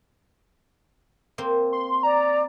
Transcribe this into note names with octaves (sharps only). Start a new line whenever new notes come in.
A#3 C4
C6
D5 A#5